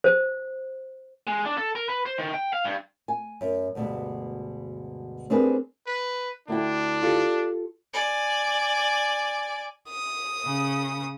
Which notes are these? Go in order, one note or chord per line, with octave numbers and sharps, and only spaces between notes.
C5
G#3
D4
A4
A#4
B4
C5
D#3
G5
F5
G2
G#5
F#2
D2 G2 B2 G3 G#3
C4 D4 G4 G#4 A#4 B4
B4
D2 D4 E4 G5
F4 G4 A4
D5 G#5
D#6
C#3